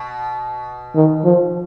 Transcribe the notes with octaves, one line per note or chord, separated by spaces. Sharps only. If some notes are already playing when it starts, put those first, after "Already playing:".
Already playing: B2
D#3
F3